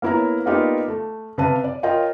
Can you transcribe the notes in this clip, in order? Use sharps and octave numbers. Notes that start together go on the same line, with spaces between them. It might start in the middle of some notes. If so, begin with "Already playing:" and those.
A#3 B3 E4 C#5 A#5
A#3 B3 D#4 F4 G4 D5
A3
C3 B4 F5 A5 D#7
D5
F4 A#4 C#5 D#5 G5